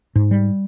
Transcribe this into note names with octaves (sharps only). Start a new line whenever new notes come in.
G#2
G3